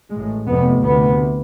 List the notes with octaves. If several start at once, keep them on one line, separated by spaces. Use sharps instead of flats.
A1 A2 G#3
F1 F2 C3 B3
D2 C3 B3